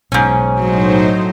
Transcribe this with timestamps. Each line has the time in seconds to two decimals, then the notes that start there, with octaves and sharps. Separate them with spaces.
0.12 B1 G#2 B2 C#4
0.59 A2 F#3 D#4 C5